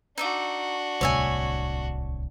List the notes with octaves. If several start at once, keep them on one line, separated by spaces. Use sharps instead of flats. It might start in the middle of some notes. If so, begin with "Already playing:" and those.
D4 D#4 F#4 E5 D6
D1 C2 C#5 E5 G#5